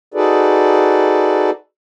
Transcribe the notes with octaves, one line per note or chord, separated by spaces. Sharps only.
D#4 F#4 G#4 A4 B4 D5